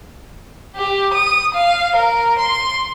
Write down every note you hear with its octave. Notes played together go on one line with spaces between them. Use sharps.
G4
D#6
F5
A#4
C6